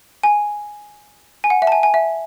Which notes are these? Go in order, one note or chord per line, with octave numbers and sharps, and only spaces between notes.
G#5
G#5
F#5
E5
A5
G#5
G#5
E5